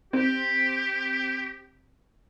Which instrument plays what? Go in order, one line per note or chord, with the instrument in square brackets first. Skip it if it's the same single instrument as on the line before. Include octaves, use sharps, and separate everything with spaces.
[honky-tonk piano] C4 [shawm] G4